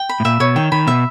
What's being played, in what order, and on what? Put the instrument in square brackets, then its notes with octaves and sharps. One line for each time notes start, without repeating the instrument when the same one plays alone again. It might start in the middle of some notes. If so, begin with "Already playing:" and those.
Already playing: [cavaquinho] G5
B5
[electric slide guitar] A2
[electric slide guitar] A#2 [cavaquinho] E5
[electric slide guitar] B2 [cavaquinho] C#5
[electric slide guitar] D#3 [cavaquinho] G5
[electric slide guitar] D#3 [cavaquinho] B5
[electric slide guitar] B2 [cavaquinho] E5